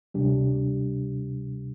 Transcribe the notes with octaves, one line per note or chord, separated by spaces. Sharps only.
D2 C3 G3 D4 G4